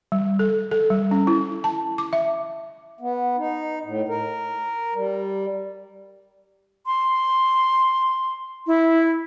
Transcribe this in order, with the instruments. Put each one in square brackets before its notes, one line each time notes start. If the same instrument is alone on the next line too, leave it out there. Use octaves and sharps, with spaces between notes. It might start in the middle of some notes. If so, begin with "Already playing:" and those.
[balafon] G3
A4
A4
G3
C#4
E4
A5
D6
E5
[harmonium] B3
D#4
A2
A#4
G3
[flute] C6
E4